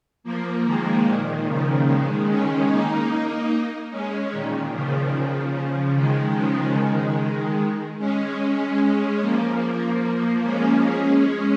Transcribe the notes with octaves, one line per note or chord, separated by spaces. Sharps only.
F3 A#3
D#3 G#3
A#2 D#3
C#3 F3
D#3 G#3
G#3 C#4
A#3 D#4
G#3 C#4
A#2 D#3
C#3 F3
D#3 G#3
C#3 F3
D#3 G#3
G#3 C#4
G#3 C#4
F3 A#3
G#3 C#4
G#3 C#4
G#3 C#4